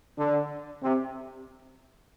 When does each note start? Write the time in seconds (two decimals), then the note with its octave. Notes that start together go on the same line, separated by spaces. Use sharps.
0.18 D3
0.83 C3